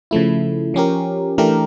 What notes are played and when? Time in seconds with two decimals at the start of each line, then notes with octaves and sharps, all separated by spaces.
0.11 C#3 F3 A3 E4
0.74 F3 C#4 G4 A#4
1.38 E3 A3 D4 G4 A#4